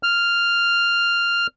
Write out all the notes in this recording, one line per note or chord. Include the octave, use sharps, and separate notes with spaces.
F6